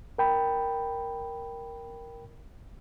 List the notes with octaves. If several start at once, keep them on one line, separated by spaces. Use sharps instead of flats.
A#4 G5 B5